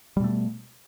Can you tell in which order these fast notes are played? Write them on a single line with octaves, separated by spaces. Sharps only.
G3 B2 A3